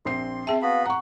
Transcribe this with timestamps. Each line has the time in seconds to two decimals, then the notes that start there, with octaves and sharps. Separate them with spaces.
0.05 A#1 C4 C6 C7
0.47 C4 G#4 E5 G5 A5
0.62 B3 F#4 F5 B5
0.85 F#5 A#5 C#6